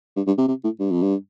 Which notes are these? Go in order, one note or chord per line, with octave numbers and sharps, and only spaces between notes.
G2
G2
C3
C3
A2
G2
F2
G2